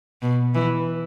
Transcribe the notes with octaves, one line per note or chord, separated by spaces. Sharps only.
B2
E3